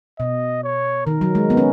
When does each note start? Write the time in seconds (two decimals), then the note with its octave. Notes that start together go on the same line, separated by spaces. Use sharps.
0.19 B2 D#5
0.64 C#5
1.06 D#3 A#4
1.21 F#3
1.35 G#3
1.50 B3
1.57 C#4